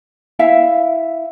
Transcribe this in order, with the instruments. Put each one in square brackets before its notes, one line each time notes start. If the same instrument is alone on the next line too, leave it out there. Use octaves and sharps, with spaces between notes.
[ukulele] E4 E5 F5